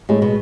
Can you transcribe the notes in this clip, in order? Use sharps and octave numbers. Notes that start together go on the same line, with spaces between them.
A2 G#3
B2